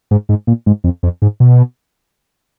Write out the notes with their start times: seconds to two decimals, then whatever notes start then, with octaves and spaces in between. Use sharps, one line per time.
0.11 G#2
0.29 G#2
0.47 A#2
0.66 G#2
0.84 F2
1.03 F2
1.22 G#2
1.40 B2